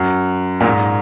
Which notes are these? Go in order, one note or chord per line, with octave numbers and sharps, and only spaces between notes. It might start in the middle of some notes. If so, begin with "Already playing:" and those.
Already playing: F#2
A#2
G#2